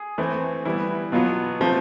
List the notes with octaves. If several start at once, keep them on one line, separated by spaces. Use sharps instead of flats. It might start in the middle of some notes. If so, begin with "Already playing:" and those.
Already playing: G#4
E3 A3 C4
E3 G3 B3 E4
B2 F#3 B3 F4
C3 F3 A3 C4